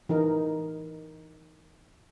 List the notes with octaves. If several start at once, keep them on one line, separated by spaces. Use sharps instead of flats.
E3 D#4 A#4